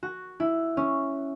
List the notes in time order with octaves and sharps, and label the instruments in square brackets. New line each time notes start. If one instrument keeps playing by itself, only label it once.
[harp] F#4
E4
C#4